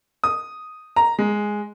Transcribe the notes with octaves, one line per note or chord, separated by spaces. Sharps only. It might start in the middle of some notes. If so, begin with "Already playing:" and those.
D#6
A#5
G#3